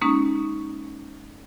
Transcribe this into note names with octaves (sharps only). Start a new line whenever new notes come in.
G#3 A#3 C#4 D#4